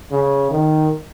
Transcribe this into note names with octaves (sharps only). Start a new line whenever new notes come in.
C#3
D#3